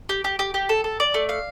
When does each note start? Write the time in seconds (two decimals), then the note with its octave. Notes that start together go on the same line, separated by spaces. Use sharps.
0.09 G4
0.24 G4
0.39 G4
0.54 G4
0.69 A4
0.84 A4
1.00 D5
1.14 A3
1.29 F5